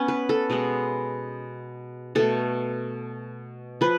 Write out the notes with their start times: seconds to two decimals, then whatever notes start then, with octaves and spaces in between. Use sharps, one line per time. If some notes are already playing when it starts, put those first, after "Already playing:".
Already playing: B3 C#4
0.08 B4
0.29 A4
0.50 B2 G#3 B3
2.15 B2 A3 A4
3.81 F3 B4